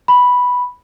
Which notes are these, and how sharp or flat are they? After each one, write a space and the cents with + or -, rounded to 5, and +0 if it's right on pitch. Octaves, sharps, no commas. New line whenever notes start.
B5 -5